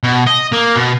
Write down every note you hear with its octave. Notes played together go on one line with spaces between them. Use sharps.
B2
D#5
A#3
B2